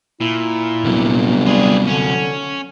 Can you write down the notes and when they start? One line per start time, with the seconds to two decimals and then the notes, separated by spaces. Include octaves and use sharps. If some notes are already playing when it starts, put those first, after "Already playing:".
0.21 A#2 E4
0.85 G1 C3 F#3
1.46 G3 F4 G#4
1.87 D3 C#4